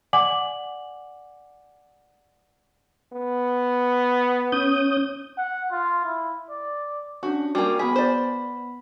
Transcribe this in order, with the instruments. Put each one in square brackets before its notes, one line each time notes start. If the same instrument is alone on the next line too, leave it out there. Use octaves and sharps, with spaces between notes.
[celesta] D5 F#5 G#5 D6 F#7
[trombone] B3
[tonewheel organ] C#4 D#6 G6
[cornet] F#5
F4
E4
D5
[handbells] C#4 D4 [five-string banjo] F#4
[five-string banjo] G3 A#3 [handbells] F#4 G5 G#5
[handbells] B3 B5 B6 [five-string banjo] G#4
[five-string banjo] C5 D5